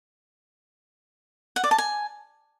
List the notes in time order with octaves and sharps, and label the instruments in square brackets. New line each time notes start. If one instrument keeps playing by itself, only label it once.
[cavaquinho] F#5
D5
A5
G#5